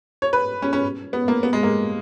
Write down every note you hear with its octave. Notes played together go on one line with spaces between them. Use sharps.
C#5
B4
C#4
C#4
B3
A#3
B3
G#3
A#3